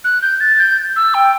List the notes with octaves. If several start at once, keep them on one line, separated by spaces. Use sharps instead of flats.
F#6
G6
A6
G6
E6
G5